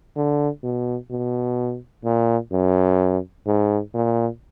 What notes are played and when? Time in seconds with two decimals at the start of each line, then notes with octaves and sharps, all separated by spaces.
0.16 D3
0.63 B2
1.11 B2
2.05 A#2
2.52 F#2
3.46 G#2
3.94 A#2